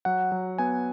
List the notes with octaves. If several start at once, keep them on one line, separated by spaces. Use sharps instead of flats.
F#3 F#5
F#3
B3 G#5